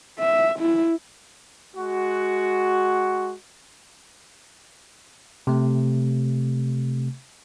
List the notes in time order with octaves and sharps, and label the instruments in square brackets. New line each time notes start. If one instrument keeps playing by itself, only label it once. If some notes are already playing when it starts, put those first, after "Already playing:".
[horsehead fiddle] E5
E4
[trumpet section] G#3 F#4
[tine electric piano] C3 A3